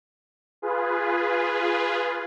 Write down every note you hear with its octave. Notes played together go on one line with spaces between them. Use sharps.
F4 G#4 B4